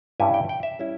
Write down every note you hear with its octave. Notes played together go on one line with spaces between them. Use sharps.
G2 G3 C#4 E4 G#5
G5
G5
E5
G3 C#4 E4